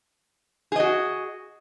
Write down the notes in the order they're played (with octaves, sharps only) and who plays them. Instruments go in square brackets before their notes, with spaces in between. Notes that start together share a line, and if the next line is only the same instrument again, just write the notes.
[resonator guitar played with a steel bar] G#4
D#5
F#4